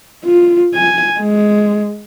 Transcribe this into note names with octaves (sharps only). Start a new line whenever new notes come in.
F4
G#5
G#3